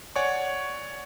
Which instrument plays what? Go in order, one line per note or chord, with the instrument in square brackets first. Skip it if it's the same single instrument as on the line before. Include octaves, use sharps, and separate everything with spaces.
[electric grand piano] C#5 D5 F#5 G#5 C#6